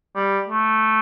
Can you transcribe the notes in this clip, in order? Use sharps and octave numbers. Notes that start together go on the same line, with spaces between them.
G3
A3